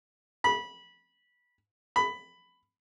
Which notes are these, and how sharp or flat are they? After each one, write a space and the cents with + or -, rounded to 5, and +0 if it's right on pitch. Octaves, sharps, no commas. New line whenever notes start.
B5 -20
B5 +10